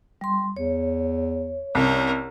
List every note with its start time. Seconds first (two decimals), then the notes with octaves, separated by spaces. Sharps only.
0.21 G3 C6
0.57 E2 C#5
1.75 C2 C#4 A#4